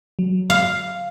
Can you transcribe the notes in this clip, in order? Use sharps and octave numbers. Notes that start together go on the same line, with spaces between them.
F#3
F5